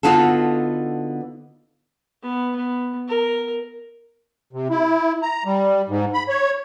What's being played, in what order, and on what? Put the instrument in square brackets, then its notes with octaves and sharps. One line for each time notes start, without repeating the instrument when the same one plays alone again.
[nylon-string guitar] D3 B3 D#4 F4 F#4 A4
[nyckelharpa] B3
B3
A#4
[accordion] C3
E4
A#5
G3
G#2
B5
C#5